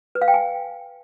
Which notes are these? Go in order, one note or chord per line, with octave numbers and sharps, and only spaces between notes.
B4
F5
G5
G#5